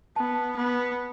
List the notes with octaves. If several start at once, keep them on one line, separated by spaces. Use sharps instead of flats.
B3 A5
B3